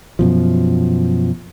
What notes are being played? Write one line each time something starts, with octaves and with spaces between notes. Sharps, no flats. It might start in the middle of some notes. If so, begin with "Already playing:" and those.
F#2 B2 F3